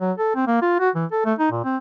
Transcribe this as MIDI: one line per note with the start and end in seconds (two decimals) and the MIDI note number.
0.01 0.12 54
0.18 0.34 69
0.36 0.46 60
0.47 0.60 58
0.62 0.76 65
0.80 0.90 66
0.95 1.05 52
1.12 1.21 69
1.25 1.34 57
1.39 1.50 63
1.52 1.64 46
1.64 1.77 60